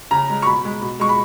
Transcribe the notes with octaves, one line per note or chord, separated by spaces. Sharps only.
C#3 A#5
G#3
C#6
B2 B5
G#3
B2
G#3 C#6
B5